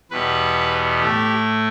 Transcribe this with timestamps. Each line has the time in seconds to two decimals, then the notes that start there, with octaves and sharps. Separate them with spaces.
0.11 E2 B2 G3 B4
1.01 A2 A3 G4